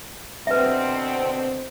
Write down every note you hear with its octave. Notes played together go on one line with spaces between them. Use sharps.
B2 D3 C4 B4 E5